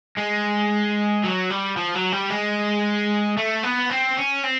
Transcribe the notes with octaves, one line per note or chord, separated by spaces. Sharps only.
G#3
F#3
G3
F3
F#3
G3
G#3
A3
B3
C4
C#4
C4